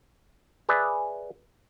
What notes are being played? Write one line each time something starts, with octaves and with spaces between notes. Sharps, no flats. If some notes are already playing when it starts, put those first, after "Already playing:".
G#4 B4 D5 E5